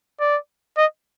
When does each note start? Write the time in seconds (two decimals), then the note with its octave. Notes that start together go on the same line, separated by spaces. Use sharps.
0.20 D5
0.77 D#5